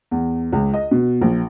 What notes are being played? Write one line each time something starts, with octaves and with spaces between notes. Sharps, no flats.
E2
C#2
D#5
B2
A#1